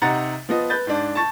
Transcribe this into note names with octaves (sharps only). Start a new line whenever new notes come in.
C3 D#4 F#5 A#5 A6
F3 B3 D#5
B4 G6 A6
G#2 D4
A5 C#6 A6